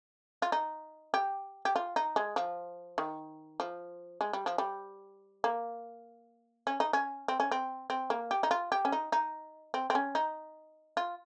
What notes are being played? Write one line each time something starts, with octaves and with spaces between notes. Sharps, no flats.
F4
D#4
G4
G4
F4
D#4
G#3
F3
D#3
F3
G#3
G3
F3
G3
A#3
C#4
D#4
C#4
C4
C#4
C4
C4
A#3
G4
D#4
F4
G4
C#4
D#4
D#4
C4
C4
C#4
D#4
F4